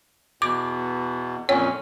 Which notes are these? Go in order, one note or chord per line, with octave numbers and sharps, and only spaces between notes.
E2 B2 D6
F2 A#2 C#4 C#5